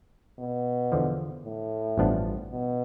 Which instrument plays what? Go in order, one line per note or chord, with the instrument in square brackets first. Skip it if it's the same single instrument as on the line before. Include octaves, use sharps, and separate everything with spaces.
[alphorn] B2
[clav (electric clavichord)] E2 D3 F3
[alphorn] A2
[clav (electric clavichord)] A1 G2 F3 B3 D4
[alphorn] B2